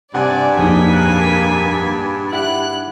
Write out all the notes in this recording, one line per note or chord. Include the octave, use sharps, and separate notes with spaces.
G2 C3 D5 F#5 G#5
A#1 F2 A#3 D#4 G#4 F#5 G#5 B6
F#6
E4 G4 F#5 F#6